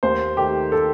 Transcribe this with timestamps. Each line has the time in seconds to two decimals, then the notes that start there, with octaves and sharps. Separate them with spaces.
0.03 D#2 C5
0.37 D#3 A3 G4
0.72 A4